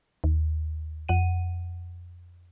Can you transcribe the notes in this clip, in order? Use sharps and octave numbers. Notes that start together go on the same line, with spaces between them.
D#2
F2 F#5 D#7